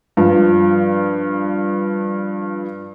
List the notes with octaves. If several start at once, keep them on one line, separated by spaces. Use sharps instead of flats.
G2 F3